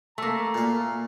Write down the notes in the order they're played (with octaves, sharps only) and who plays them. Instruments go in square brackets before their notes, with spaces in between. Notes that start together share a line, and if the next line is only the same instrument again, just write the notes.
[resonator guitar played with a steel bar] A3 A#3 [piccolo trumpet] A#5
[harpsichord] A#2 F5